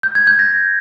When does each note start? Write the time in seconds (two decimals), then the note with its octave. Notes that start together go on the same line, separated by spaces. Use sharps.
0.03 G6
0.15 G#6
0.27 G6
0.39 A#6